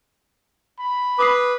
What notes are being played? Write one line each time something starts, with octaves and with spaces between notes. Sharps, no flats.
B5
B4 D6 D#6 C7